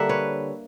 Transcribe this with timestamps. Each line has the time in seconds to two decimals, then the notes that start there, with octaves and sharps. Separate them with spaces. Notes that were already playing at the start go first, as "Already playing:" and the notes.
Already playing: D3 G3 A#3 E5 F#5
0.09 B4 C#5